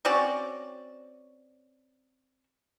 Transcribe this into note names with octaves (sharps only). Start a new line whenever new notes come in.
C4 C#4 F#4 D5